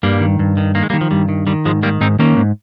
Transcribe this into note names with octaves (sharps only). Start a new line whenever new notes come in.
G2 G3 A#3
D#3
G2
D#3
D#3 A#3
G#3
G3 A#3
D#3
F3
G2 G3
D#3
D#3 G3
G#2 F3 G#3
D#3 G3 A#3
G#2 C4 D#4
D#3 A#3 C#4
G#2